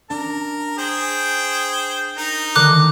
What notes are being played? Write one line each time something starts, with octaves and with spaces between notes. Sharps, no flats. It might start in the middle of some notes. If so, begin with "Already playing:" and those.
D4 A#4
G#4 C5 G5
D#4 A#4
D3 D#3 G3 D6 F#6